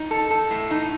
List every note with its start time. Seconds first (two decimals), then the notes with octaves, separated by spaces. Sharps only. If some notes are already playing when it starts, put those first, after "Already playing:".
Already playing: D#4
0.11 A4
0.31 A4
0.51 A2
0.71 D#4